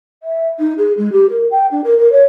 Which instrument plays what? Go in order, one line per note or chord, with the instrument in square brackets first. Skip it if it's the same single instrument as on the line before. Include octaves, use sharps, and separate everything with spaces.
[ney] E5
D#4
G#4
G#3
G4
A#4
G5
D4
A#4
A#4
C#5